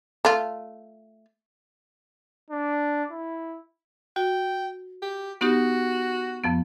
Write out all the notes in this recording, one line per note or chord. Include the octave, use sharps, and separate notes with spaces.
A3 F4
D4
E4
F#4 G5
G4
B3 D#4 F#4 G4
F2 F3 B3